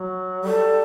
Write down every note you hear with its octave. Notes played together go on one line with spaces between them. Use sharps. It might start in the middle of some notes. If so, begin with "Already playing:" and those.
Already playing: F#3
G3 A4